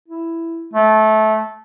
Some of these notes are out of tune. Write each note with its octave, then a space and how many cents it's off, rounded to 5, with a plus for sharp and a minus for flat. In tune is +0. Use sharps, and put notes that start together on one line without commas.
E4 +5
A3 -20